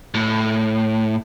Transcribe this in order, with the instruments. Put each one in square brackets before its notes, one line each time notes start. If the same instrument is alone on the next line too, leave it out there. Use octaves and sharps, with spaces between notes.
[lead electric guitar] A2